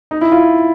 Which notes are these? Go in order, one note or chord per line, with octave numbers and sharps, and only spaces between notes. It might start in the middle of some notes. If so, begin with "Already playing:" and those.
D#4
E4
F4